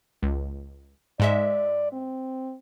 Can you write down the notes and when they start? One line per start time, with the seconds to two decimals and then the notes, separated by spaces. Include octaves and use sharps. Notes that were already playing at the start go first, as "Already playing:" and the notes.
0.23 C#2
1.20 G#2 G#3 D5 E5
1.93 C4